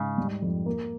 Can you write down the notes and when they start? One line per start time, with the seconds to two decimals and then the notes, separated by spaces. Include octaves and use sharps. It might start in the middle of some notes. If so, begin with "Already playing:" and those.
Already playing: G#2 C#3
0.18 G3
0.42 F2
0.66 A#3